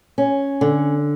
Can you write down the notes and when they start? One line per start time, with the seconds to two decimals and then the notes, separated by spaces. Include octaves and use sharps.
0.18 C#4
0.61 D3